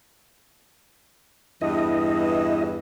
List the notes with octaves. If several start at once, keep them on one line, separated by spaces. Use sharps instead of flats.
E2 G2 E3 E4 D#5